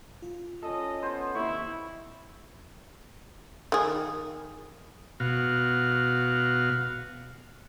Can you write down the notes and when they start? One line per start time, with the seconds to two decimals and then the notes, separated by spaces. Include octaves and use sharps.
0.22 F4
0.63 C#4 A4 D#5
1.02 B3 C5
1.35 D#2 C3 E4 E5 C#6
3.72 D#3 G#4
5.20 B2 F#4 F5